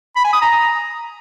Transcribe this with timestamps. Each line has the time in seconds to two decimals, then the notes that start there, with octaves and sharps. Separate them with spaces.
0.16 B5
0.25 G#5
0.33 D#6
0.42 A#5